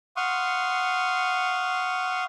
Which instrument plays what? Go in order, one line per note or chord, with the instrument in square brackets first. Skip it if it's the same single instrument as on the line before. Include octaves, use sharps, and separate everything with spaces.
[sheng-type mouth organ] F5 F#5 C6 C#6 D#6